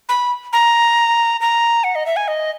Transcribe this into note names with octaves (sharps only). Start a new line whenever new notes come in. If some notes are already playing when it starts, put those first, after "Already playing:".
B5
A#5
A#5
F#5
D#5
E5
G#5
D#5